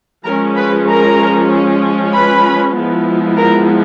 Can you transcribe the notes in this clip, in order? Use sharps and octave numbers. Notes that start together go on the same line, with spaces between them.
F3 G#3 C#4 A#4 A#5
B4 B5
A#4 A#5
B4 B5
F3 G#3 B3 E4
A#4 A#5